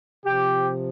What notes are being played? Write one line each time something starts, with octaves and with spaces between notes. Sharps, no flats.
C3 F3 G4